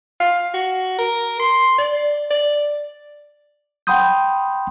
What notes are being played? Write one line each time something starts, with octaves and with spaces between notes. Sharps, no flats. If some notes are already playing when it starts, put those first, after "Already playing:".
F5
F#4
A#4
C6
D5
D5
F#5 G5 B5 C6 D#6 G6